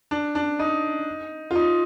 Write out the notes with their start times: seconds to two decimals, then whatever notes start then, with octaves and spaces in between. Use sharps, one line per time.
0.11 D4
0.35 D4
0.59 D#4
1.51 F4
1.55 D#4